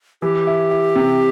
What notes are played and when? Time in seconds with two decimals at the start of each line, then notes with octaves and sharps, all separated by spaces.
0.22 E3 G4
0.47 E4
0.71 E4
0.95 C3